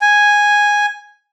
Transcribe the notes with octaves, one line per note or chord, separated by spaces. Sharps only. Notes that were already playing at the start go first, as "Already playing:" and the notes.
G#5